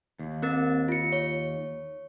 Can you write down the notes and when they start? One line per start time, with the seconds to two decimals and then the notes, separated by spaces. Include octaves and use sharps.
0.19 D#2
0.42 C4 A#4 A6
0.88 F4 C#7
1.12 C#5